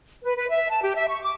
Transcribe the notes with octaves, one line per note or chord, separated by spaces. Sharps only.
B4
B4
E5
A5
G4
E5
C#6
D6